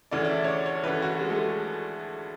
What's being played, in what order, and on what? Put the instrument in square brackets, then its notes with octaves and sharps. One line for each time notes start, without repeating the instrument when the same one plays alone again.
[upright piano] D2 C#3 E3 D5
D5
E5
C#5
D5
C#5
D2 C#3 E3 B4
F#4
G#3
A3
G#3